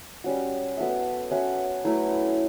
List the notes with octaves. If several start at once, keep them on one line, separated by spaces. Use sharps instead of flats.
G3 C#4 F#4
B3 F#4 A4 E5
C#4 F#4 B4 E5
F#3 A3 E4 B4